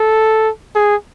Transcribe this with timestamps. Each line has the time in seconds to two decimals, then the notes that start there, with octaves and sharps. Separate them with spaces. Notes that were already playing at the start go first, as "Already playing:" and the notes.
Already playing: A4
0.75 G#4